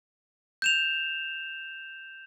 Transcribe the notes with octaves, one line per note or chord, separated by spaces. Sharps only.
G6 E7 F7